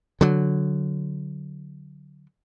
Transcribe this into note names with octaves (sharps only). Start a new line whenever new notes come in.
D3 F#3